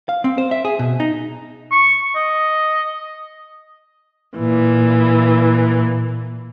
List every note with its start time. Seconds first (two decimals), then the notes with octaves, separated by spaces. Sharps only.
0.09 F5
0.24 C4
0.38 C5
0.51 E5
0.65 G#4
0.79 B2
1.00 D#4
1.72 C#6
2.16 D#5
4.37 A#2 E3